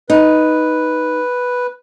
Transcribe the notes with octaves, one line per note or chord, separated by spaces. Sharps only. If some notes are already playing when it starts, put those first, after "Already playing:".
D#4 B4